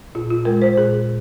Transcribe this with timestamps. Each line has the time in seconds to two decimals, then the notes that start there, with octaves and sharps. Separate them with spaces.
0.15 A#2 F4
0.30 F4
0.45 G#3 A#4
0.62 C5
0.77 A#2 G#4